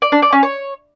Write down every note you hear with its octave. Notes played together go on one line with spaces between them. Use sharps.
D5
D4
D5
C#4
C#5